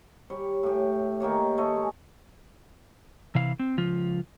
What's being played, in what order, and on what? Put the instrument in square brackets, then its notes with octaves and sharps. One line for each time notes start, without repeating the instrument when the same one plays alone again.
[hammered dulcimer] G3 C#5
A2 G4
D#3 A#3 G4 C#5
A3 C#5 D#5 C6
G#3
[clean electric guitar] C3 E3 F5
C4
C#2 F3 F4